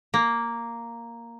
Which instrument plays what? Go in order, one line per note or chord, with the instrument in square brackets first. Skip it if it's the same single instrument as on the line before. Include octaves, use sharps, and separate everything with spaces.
[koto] A#3